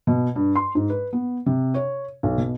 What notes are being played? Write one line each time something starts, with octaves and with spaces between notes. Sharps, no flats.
B2
G2
C6
G#2
B4
B3
C3
C#5
B1
B2